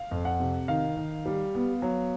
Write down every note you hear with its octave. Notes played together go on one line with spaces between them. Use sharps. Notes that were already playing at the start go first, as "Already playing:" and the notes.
Already playing: F5
F2
F#5
C3
D#3 F5
D#3
G3
B3
F#3